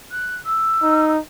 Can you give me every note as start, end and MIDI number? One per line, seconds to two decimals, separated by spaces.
0.11 0.43 90
0.45 1.09 88
0.82 1.19 63